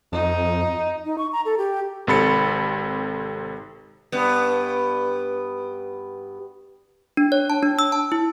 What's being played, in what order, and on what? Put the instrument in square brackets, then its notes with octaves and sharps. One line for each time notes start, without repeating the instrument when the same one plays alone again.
[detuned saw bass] F2 [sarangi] D#4
[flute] D#4
C#6
A#5
A4
G4
[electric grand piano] G#1 C3 A4 B5 A6 C#7
[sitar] G2 B3
[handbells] D4
C#5
A5
D4
E6
A5
E4